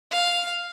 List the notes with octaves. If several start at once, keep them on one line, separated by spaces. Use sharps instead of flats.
F5